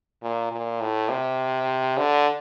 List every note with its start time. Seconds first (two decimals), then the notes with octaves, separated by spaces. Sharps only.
0.23 A#2
0.52 A#2
0.81 A2
1.10 C3
1.97 D3